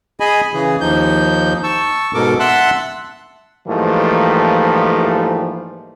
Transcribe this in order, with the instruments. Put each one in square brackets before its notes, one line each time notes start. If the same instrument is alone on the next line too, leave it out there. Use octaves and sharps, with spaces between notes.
[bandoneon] G#4 D#5 G#5 B5
C#3 E3 G#4
D#2 F3 D#4 G6
A5 C#6 E6
G#2 B2 A4 A#4 D6
E5 F#5 A5 C6 E6 F#6
[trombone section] G#2 E3 F3 G3 A3 A#3